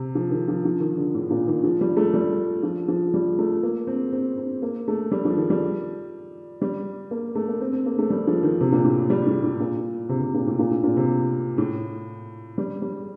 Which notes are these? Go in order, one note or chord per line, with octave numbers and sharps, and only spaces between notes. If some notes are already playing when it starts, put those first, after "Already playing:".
Already playing: C3
F3
D#3
F3
F3
D#3
D3
A2
A#2
D#3
F3
G3
A3
G3
F3
F3
G3
A3
A#3
C4
C4
C4
A#3
A3
G3
F3
D#3
G3
G3
A#3
A3
A#3
C4
C4
A#3
A3
G3
F3
D#3
C3
A#2
A2
G3
A2
A2
A#2
C3
C3
A#2
A2
A#2
A2
A#2
C3
A2
G3
G3